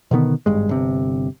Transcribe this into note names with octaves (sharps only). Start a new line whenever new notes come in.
B2 D3 D#3 B3
G#1 G2 G#3
G1 C3